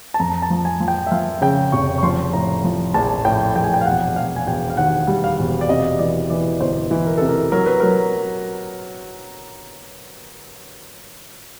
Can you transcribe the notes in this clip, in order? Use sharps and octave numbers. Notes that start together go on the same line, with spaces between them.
A5
F2 A#5
A5
F3
G#5
F3
G5
E5
F3 F5
C#3 G5
F1 C#6
C#6
F3 C6
A2 A#5
F3
A#1 A5
A2 G5
A#1 G5
G#5
G5
F5
E1 F#5
E1 F5
G#5
E1 G5
F5
D#2 F#5
G3
F5
E1
D5
C3 D#5
E3 D5
E3 D5
G1 C5
E3
A#4
C3 A4
A#4
F#3 A#4
B4
F#3 A#4